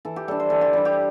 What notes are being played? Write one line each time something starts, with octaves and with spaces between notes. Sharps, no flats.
E3 A4
G4
G3 D4 A4
C5
E3 A4
G4
G3 D4 E4
G4